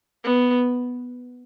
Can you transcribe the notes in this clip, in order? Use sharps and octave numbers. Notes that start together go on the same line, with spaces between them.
B3